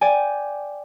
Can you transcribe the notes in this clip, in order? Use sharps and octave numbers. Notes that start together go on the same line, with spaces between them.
D5 G5 G#5